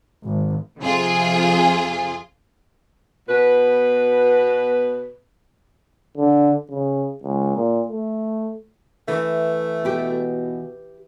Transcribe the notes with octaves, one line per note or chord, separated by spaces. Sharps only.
G#1
F2 C3 F4 G#4
B2 B4
D3
C#3
C#2
A#2
A3
E3 A3
B2 G4 B4